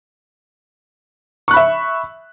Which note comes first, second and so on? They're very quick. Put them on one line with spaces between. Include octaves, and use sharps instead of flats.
C#6 F#6 B5 E5